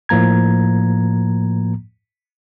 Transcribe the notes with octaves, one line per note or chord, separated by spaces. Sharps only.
A2 F3 A#3 A#5 G#6